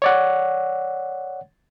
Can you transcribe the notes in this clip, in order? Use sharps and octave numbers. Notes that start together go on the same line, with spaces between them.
C#5 D5 F#5